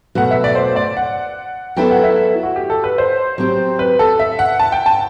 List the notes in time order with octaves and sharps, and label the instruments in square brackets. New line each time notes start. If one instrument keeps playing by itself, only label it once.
[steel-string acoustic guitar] B2 F#3 A3 [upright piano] F#5
[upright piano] E5
D5
C5
D5
F#5
[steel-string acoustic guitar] F#3 B3 E4 A4 [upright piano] G5
[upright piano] F#5
E5
F#4
G4
A4
B4
C5
[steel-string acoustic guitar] F#3 C4 G4
[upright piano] B4
A4
E5
F#5
A5
G5
A5